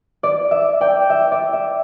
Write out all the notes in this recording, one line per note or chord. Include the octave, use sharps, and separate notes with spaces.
D5
E5
D5 G5
E5
D5
E5